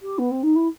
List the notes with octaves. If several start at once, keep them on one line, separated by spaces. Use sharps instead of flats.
G4
B3
C4
D#4
E4